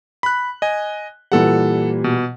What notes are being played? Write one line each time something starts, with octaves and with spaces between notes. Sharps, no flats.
B5 F#6
D#5 G#5
A#2 E3 G3 A4 F#5
B2